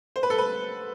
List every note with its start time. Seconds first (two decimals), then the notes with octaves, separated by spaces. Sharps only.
0.16 C5
0.23 B4
0.30 A4
0.38 B4